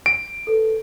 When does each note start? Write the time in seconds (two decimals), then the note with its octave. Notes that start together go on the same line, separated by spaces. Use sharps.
0.06 D7
0.47 A4 B4